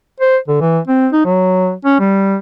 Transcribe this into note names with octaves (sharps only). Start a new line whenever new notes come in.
C5
D3
E3
C4
D#4
F#3
C#4
G3